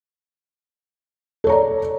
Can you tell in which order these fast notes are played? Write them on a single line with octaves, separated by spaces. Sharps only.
A4 C#5 A#5 D5